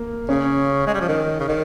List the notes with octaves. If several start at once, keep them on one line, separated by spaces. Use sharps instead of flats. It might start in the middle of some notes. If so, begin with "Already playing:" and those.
Already playing: A#3
C#3 C#4
G#3
G3
F3
D#3
C#3
D#3